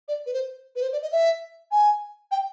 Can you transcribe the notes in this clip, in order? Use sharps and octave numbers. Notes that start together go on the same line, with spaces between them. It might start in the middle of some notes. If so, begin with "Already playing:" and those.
D5
B4
C5
B4
C5
D5
D#5
E5
G#5
G5